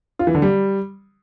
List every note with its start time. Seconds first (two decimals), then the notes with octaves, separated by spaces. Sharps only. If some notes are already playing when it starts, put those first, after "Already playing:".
0.19 F4
0.27 E3
0.35 D3
0.42 G3